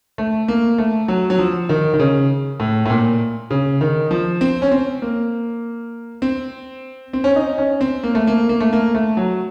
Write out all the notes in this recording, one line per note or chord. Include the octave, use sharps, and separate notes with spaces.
A3
A#3
A3
F#3
F#3
F3
D#3
D#3
C#3
A2
A2
A#2
C#3
D#3
F3
C4
C#4
C4
A#3
C4
C4
C#4
D#4
C#4
C4
A#3
A3
A#3
A#3
A3
A#3
A3
F#3